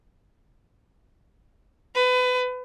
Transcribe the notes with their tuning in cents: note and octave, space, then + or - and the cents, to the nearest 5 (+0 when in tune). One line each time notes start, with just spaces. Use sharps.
B4 +25